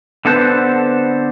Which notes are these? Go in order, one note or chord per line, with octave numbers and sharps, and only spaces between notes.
D3 B3 C4 A4 B4 C5